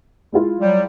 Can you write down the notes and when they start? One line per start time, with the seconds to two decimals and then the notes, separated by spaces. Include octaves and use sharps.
0.32 G#3 E4 F4
0.60 F#3 G3